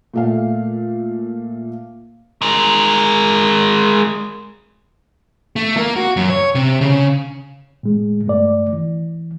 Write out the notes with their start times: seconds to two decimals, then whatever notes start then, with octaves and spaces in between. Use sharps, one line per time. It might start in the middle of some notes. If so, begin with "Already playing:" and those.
0.14 A#2 A3 F5
2.42 G#3 A#4
5.56 A3
5.77 A#3
5.96 F#4
6.16 F#2
6.30 C#5
6.55 C3
6.81 C#3
7.83 A2 G#3
8.26 G2 A3 D5
8.73 E3